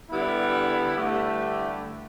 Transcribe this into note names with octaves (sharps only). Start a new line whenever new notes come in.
D3 G3 B3 E4
G2 D3 A3 E4 G4